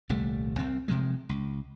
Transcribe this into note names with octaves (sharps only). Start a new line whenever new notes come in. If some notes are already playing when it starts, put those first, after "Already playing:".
D#1 C2 G3 A3
C2 C4
F1 C3 F3 G#3
C#2